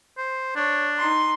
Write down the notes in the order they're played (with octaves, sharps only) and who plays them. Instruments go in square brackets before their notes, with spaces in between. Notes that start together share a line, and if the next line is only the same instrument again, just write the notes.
[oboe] C5
[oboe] D4 [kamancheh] C#5
[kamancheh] D#4 C6